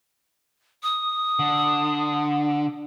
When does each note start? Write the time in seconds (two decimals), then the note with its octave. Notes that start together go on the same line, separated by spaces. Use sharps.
0.83 D#6
1.39 D3